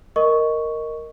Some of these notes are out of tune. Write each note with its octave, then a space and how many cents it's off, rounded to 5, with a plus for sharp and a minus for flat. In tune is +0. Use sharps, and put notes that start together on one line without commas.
A#4 -5 D#5 +0 C#6 +5